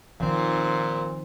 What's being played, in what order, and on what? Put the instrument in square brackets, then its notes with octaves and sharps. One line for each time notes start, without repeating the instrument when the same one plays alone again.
[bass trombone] A#2 [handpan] D#3 F3 [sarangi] C4